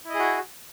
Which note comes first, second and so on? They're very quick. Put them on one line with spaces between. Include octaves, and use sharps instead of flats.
E4 D#5 G#4 F#4